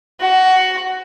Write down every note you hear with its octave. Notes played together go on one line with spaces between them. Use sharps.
F#4